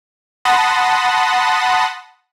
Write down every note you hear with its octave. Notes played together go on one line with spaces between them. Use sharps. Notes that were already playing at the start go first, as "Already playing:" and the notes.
F#5 A5 B5 C6 D#6 A#6